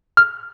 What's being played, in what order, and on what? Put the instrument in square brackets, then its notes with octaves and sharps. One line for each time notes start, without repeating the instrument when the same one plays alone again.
[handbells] F6